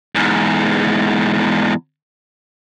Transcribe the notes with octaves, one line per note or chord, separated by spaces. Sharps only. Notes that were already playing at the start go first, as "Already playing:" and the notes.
E2 G#2